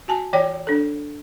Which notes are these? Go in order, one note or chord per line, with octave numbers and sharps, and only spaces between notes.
F#4 G#5 A5
E3 C#5 D5 G5
D4 A4